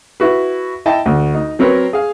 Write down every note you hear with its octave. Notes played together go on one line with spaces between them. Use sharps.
E4 F#4 B4
E4 D#5 G5 A5
D2
D#4
F#3 C4 A#4 B4 C#5
G#4 F5